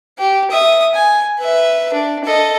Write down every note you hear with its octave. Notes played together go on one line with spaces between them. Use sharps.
G4
E5 D#6
G#5
B4 E5
D4
A4 D#5